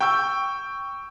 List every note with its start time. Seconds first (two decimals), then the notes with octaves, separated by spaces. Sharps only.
0.01 G5 C#6 E6 G6